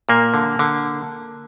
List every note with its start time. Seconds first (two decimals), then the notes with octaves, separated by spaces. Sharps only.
0.09 A#2 A#3
0.34 D3
0.59 D3